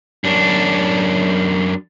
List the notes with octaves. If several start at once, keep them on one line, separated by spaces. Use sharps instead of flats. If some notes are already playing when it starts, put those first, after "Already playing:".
F#2 D4